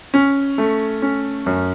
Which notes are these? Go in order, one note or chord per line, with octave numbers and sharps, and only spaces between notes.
C#4
A3
C#4
F#2